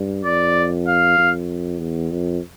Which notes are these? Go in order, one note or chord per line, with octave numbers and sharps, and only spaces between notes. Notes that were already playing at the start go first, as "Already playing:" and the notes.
Already playing: G2
F2 D5
F5
F2
E2
F2